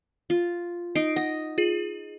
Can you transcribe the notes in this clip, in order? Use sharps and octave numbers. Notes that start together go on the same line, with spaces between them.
F4
D#4 C7 D7
D#5 F#5
F4 G#4